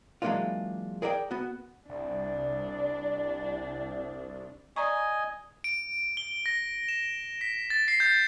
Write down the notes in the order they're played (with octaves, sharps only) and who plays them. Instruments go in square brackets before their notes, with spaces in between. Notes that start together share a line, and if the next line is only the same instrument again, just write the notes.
[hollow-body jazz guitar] E3 F#3 G#3 A#3 D4 F4
G#4 A#4 D5 E5 G5
B3 F#4
[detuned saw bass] C2 [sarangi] D4 [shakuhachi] D5
[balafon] D5 A#5 C#6 [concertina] D#5 G#5
[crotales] D7
G7
A#6
E7
B6
A6
C7
G6